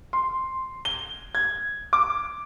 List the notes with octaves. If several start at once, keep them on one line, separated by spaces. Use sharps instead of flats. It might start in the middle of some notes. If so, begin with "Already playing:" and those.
C6
G7
G#6
D6